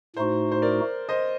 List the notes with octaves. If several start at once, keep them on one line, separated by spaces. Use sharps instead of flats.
A2 A3 D#4 F#4 C5
C5
A#4 D5
C5 D#5